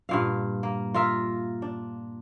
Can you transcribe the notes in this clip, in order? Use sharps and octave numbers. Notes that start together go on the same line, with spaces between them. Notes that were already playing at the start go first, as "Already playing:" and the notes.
G2 A#2 F5
A#3
F4 A#4 E5 F5
D4